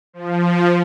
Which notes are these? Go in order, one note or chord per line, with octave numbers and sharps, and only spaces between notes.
F3